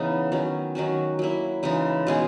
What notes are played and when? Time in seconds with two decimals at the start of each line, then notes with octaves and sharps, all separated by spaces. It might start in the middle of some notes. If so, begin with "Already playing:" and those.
Already playing: C#3 E3 B3 D#4
0.32 D#3 F#3 C#4
0.75 D#3 F#3 C#4 F#4
1.19 F#3 A#3 E4
1.63 C#3 E3 G#3 D#4
2.07 B2 G#3 C#4 G#4